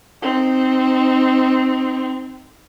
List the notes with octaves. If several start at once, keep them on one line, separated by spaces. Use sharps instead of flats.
C4 D#4